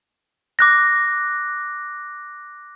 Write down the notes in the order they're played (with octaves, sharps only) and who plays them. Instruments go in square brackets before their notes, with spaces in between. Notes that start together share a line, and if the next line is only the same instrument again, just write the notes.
[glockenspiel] D6 F#6 A#6